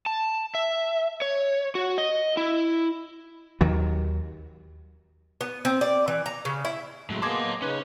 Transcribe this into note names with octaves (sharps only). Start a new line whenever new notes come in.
A5
E5
C#5
F#4
D#5
E4
D#2 D#3 F#3
B3
C4
D5
E3
A#5
C#3
E4
A2 C#3 F#3 G#3 A3
A#3 B3 G#4 D#5 A5 C6 D6 G#6
F#3
C#3 C#4 D#4 B4